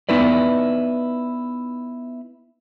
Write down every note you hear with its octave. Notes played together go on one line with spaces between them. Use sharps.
B3 D#4 E4 B4 D5